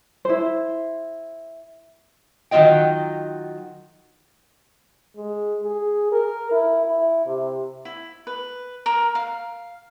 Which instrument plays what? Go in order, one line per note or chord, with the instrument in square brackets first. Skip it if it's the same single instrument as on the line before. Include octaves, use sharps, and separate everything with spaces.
[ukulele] E4 C5
[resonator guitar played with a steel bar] D#3 F#3 C4 F4 D#5 G5
[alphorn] G#3
G#4
A#4
E4
E4
C3
[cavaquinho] E4
B4
A#4
F5